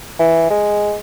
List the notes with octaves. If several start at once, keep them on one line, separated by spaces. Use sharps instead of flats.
E3
G#3